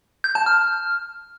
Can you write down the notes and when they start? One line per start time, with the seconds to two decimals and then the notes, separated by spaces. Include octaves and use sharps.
0.24 G6
0.35 A5
0.46 F6